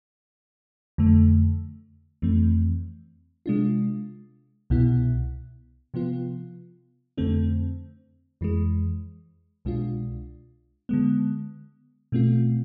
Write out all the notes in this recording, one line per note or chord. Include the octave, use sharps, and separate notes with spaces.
F2 D3 A3
F2 E3 A3 C4
C3 G#3 D4 F4
C2 B2 B3 E4
C3 F3 B3 F4
F2 D3 A3 C4
F2 E3 G#3
C2 B2 G#3 D4 F4
D3 G#3 B3
B2 A3 C4 F4